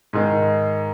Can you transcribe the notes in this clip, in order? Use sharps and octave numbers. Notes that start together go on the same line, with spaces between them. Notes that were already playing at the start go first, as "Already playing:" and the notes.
G#2 D#3 G#3